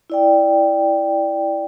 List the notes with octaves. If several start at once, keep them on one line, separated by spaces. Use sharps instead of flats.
E4 D5 G5